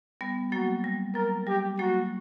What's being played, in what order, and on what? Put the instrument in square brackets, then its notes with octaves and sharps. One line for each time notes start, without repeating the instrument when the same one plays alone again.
[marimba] G3 B3
[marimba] F#3 A#3 [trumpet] F#4
[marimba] G3
[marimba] F#3 [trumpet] A#4
[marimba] G3 [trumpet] G4
[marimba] F#3 A#3 [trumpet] F#4